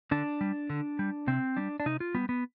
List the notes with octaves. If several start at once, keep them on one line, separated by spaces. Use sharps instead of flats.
D3 D4
G3
D3
G3
C3 C4
G3 D4
D4
C3 D#4
F4
G3 B3
B3